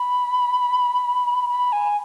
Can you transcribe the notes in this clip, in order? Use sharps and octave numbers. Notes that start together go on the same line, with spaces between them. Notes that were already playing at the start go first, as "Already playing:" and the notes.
Already playing: B5
B5
G#5